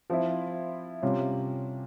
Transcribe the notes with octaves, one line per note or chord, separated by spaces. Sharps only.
F3 C4 E4
C3 G3 C#4 F4